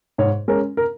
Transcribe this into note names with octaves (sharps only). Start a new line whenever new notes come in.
G#2 C#5
G#3 C#4 A#4
A#4